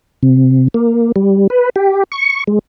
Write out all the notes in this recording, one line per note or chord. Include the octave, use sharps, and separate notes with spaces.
C3
A#3
G3
B4
G4
C#6
G#3